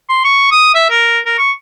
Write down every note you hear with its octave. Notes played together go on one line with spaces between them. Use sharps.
C6
C#6
D#6
E5
A#4
A#4
C#6